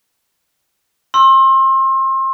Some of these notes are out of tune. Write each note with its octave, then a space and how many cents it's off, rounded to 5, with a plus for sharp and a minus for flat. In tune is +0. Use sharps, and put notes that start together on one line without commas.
C6 +30 E6 +0